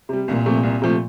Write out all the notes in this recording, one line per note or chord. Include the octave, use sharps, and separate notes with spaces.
C3 G3
C2 A#2
C3 F3 A3
C2
C3 F3 A3